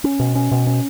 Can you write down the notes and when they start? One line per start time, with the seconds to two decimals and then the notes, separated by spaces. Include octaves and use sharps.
0.04 C#4
0.20 B2
0.35 C#4
0.51 B2
0.67 C#4